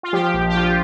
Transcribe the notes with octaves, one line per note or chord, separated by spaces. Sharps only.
F4
F3 G4
A#1
G4
F3 F4